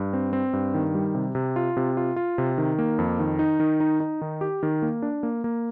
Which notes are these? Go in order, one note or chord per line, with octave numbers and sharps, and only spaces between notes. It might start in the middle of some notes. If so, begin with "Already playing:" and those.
Already playing: G2
C4
C4
G2
D#3
G3
C3
C3
F4
C3
F4
F4
C3
D#3
A#3
F2
D#3
D#4
D#3
D#4
D#4
D#3
G4
D#3
A#3
D4
A#3
A#3